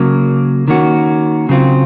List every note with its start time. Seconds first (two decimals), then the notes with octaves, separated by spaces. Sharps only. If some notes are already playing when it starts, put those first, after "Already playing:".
Already playing: C#3 F#3 A#3
0.68 D#3 A#3 C#4 F#4
1.49 C#3 F#3 C4 F4